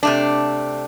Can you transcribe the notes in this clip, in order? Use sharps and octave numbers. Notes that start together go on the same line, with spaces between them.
C3 A3 D4